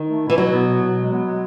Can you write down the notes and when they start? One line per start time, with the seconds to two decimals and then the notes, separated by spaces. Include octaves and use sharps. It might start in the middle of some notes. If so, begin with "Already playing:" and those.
Already playing: D#3
0.09 A3
0.23 E4
0.30 E3
0.37 B2 F#3
0.52 B3
0.67 B2
0.82 B2
0.97 G#3
1.11 B3
1.26 G#3